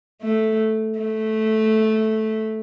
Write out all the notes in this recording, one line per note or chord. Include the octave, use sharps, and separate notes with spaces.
A3
A3